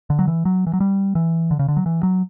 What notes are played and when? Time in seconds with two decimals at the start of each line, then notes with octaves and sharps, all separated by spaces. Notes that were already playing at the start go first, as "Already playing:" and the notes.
0.10 D3
0.19 F#3
0.28 E3
0.45 F#3
0.67 E3
0.73 F#3
0.80 G3
1.15 E3
1.51 D3
1.59 C#3
1.68 D3
1.77 F#3
1.86 E3
2.03 F#3